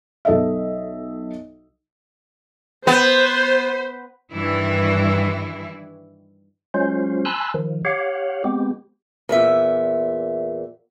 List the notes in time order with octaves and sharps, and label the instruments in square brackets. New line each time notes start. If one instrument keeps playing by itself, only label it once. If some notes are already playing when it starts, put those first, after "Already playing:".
[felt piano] B1 A4 D#5 E5
[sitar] B3 [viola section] C5
[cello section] G2 D#3 E3 E4
[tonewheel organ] F#3 G#3 C#4 F4 C5
G#5 A5 B5 C6 E6 F#6
D#3 F3
G4 C#5 F5 F#5
G#3 B3 C4 G4
[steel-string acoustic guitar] E2 A#2 E5